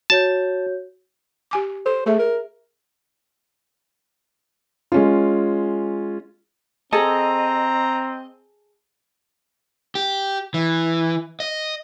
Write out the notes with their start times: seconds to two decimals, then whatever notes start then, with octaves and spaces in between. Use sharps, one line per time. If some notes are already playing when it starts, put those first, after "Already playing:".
0.10 F#4 C#5 A5 G6
1.51 G4 G#5 D6
1.86 A4 C5
2.06 A3 G#4 E5
2.19 A#4
4.92 G#3 C#4 F4
6.93 C4 G#4 A4 D#5 A#5
9.95 G4
10.54 E3
11.40 D#5